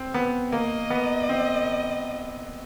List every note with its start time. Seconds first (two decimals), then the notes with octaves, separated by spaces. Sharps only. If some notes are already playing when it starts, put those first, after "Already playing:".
Already playing: C4
0.14 B3
0.52 A#3 D#5
0.90 B3
1.29 C4